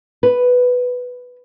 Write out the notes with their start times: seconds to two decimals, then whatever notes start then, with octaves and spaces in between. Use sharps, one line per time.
0.23 B4